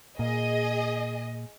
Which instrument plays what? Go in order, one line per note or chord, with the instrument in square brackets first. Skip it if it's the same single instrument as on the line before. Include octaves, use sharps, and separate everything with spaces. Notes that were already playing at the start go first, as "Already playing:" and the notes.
[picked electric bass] A#2 [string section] G#4 D#5